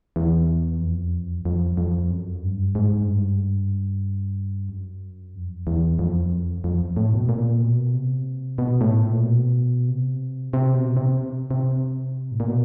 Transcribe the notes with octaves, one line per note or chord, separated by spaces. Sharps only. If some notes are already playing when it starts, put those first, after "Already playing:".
E2
F2
F2
F2
F#2
G2
G#2
G2
F#2
F2
E2
F2
F2
A2
B2
A#2
B2
C3
B2
A2
A#2
B2
C3
C3
B2
C3
C3
A2
A#2
B2